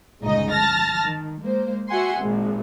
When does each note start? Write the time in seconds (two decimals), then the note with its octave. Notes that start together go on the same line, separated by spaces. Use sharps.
0.23 G1 C#2 A#2 C#3 D#4 D#5
0.52 A5 F6 A6 A#6
1.03 D#3
1.42 G#3 A#3 C5
1.88 F#4 E5 F#5 G#5 C6
2.20 G#1 A#2